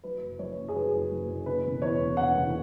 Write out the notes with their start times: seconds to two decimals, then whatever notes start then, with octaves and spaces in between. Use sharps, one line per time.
0.04 F#3 B4
0.22 F#1
0.39 F#2 C#5
0.58 F#1
0.68 G#4
0.75 F#3 B4
0.93 F#1
1.11 F#2
1.28 F#1
1.46 C#3 B4
1.64 E1
1.82 E2 C#5
2.00 E1
2.17 C#3 F#5
2.35 E1